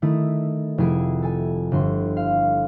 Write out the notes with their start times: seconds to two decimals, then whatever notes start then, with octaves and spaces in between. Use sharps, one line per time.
0.02 D#3 A3 E4 D#6
0.78 F1 E4 G#4 D7
1.22 A4 G#5
1.71 G1 C6
2.17 F5